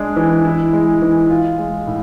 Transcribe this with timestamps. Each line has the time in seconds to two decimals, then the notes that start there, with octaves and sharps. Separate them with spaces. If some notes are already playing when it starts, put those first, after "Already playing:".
Already playing: G#3 D4
0.16 E3
0.45 E4
0.73 G#3
1.02 E3
1.30 F4
1.58 G#3
1.87 A2